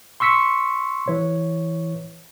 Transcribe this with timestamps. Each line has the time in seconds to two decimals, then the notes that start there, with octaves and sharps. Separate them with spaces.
0.20 C6 C#6 E6 B6 C#7
1.08 E3 C#5